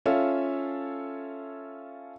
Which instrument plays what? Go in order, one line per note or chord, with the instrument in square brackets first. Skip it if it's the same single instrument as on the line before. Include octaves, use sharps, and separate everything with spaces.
[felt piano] C#4 F4 A4 C#5 E5 F5